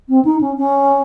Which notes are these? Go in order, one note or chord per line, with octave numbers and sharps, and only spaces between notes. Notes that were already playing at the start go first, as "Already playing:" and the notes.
C4
D#4
C#4
C#4